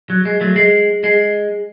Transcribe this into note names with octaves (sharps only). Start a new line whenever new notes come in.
F#3
G#3
F#3 A3
G#3
G#3